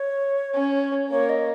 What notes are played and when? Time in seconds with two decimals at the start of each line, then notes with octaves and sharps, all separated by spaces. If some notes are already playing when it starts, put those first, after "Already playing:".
Already playing: C#5
0.54 C#4
1.10 A#3 C#5
1.29 D#5